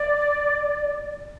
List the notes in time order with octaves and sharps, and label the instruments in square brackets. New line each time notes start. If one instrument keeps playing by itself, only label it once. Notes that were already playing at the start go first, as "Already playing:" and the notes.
Already playing: [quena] D5